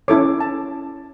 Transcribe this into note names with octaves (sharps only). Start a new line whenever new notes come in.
C#4 E4 A4 C#5 D6
A5